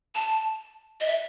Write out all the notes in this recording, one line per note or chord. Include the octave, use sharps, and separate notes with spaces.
A5
D#5
E5